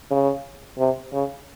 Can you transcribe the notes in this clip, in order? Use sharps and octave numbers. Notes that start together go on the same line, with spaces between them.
C#3
C3
C#3